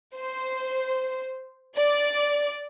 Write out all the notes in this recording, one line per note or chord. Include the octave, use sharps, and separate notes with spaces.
C5
D5